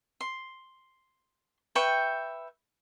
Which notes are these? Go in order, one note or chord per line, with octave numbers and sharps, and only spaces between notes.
C6
B4 E5 G5 C#6